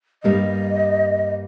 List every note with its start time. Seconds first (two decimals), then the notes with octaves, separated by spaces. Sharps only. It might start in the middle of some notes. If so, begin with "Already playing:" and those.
0.23 G2 G3 A#3 D#5